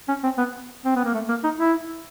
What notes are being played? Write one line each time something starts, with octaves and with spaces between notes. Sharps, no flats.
C#4
C4
B3
C4
B3
A#3
A3
A#3
D#4
E4